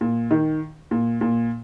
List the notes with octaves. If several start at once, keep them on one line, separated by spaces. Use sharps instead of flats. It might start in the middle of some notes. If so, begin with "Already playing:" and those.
A#2
D#3
A#2
A#2